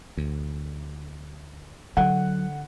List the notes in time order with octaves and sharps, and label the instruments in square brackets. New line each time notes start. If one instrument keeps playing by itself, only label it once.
[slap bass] D2
[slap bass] D3 [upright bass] F#3 [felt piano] F#5